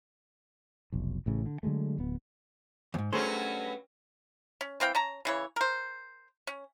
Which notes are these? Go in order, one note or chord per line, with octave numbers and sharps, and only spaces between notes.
F1 B1
A1 A2 C#3
D3
D3 F#3 G#3 A3
D1 B3
E2 G#2
G2 F#3 A3 C#4 G#4 C5
C#4
E3 C4 F5 G5
C#4 A5 A#5
C#3 E3 C#5
A#4 C5
C#4